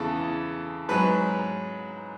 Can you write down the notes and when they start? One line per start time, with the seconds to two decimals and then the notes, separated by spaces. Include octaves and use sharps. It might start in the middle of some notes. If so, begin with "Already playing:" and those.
Already playing: E2 C#3 E3 A4
0.88 G#2 F#3 B4